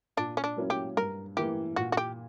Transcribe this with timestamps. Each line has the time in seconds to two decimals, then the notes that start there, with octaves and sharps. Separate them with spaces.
0.17 A#2 D4
0.37 C#4
0.44 D4
0.57 F#3 A#3 C#4 E4
0.70 G4
0.97 G2 A#4
1.37 E3 A#3 E4 G4
1.76 A#2 F#4
1.92 F#4
1.97 G4